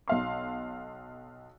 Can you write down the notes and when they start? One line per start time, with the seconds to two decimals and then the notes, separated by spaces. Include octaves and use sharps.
0.08 B1 F5 C6